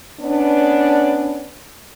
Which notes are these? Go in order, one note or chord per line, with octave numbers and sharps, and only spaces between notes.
B3 C#4 D4